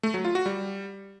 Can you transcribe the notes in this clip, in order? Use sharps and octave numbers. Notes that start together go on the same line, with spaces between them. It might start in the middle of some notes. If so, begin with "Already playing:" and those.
A3
F#3
F4
F#4
G3